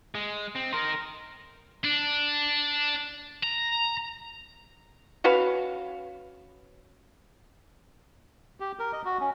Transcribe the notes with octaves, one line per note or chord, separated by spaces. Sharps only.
G#3
C4
D#4 A#4 C6 A#6
D4
A#5
C#4 F#4 B4 F5
G4
A#4
D#5
F#4
C#4